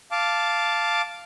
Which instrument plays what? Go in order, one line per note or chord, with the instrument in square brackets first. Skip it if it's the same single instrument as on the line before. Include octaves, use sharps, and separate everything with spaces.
[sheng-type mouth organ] F5 A5 D6